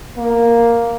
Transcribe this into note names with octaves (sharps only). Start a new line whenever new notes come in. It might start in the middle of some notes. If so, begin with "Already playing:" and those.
A#3